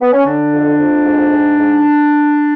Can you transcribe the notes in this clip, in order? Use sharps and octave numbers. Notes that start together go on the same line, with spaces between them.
B3
C#4
D3 D4
F2
F2
G#2
G#2
G#2